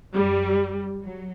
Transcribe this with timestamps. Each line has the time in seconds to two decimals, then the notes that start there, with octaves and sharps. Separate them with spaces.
0.13 F#2 F#3 G3
1.04 F#3